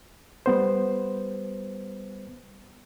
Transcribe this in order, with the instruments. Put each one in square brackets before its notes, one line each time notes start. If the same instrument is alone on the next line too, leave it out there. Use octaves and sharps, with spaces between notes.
[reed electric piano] G3 B3 C5